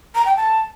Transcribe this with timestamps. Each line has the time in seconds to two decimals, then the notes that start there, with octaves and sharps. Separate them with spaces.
0.15 A#5
0.26 G5
0.36 A5